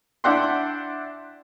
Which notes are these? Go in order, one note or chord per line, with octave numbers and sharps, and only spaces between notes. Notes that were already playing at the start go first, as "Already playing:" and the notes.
D4 E4 D5 F#5 G5 C6